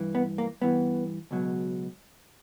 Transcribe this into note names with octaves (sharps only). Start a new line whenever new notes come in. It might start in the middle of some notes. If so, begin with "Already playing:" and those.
Already playing: G2 E3
B3
A#3
G2 E3 B3
C#2 B2 F#3